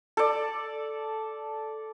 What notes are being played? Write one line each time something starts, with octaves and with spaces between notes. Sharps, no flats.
A4 D5